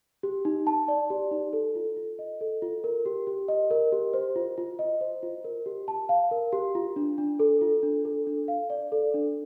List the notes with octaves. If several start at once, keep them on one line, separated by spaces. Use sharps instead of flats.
G4
D#4
A5
D5
G4
D#4
A4
F4
F4
D#5
A4
F4
A#4
G4
G4
D#5
A#4
G4
C5
F4
F4
D#5
C5
F4
A#4
G4
A5
F5
A#4
G4
F4
D4
D4
A4
F4
D4
A4
D4
F5
D5
A4
D4